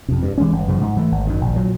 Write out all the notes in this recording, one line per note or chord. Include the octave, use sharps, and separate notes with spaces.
F2 C3
G2
E3 G#3 C#4
G1
F#2 C#3 F3
G#2
E3 A3
G#1
F#2 D#3
A#1
A#2 F#3